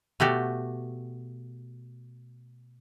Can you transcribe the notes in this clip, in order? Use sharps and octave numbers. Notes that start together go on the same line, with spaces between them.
B2 A3 F#4 G4